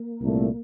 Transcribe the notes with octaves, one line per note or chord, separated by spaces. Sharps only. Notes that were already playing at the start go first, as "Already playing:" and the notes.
Already playing: A#3
C2 A#2 A3